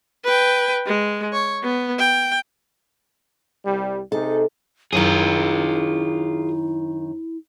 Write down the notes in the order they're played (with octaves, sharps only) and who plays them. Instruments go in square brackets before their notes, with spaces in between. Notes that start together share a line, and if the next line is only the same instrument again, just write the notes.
[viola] B4 G5
G#3
C#5
B3
G5
[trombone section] C2 G3
[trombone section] C3 D#4 G#4 [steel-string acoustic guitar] A4
[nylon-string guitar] F#2 D#3 [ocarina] E4 [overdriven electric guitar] F4 G#4